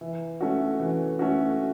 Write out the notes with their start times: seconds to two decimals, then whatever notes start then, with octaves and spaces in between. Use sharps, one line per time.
0.01 E3
0.41 A3 C#4 F#4
0.80 E3
1.19 A3 C#4 F#4